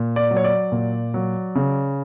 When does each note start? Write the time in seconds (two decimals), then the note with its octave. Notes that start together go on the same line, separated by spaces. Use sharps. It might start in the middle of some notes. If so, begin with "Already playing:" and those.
Already playing: A#2
0.16 D5
0.31 F#3
0.36 C#5
0.44 D5
0.72 A#2
1.14 F#3
1.55 C#3